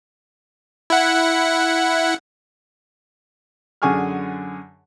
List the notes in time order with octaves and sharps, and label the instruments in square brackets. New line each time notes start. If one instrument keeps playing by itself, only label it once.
[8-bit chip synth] E4 F#5
[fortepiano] F#2 D3 G#4 G#5 C#6 F6